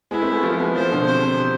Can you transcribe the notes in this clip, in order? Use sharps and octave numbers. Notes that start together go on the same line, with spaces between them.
G#3 B3 E4
A3 C4
G#3 B3
F3 A3 F4
G#3 B3
F3 A3 C5
B2 D3
C3 C5
C3